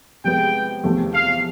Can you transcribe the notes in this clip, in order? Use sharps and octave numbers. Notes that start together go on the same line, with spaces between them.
C3 F3 G#3 B3 G5
E2 C3 F3 A3
F5